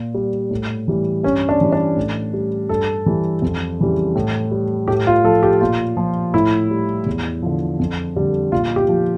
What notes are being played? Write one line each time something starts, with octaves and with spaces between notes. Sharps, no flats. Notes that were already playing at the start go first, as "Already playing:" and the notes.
Already playing: A#2
G3
A2
E3 G3
G2 C#4
D4
E3 G3
D4
A2
G3
G2 A4
E3 G3
F2
C#3 E3 G3
A2
G3
A2 G4
F4
F3 A4
G4
A#2 F4
F3
A2 E4
G3
E2
D3 F3
F2
D3 G3
A#2 F4
G4
F3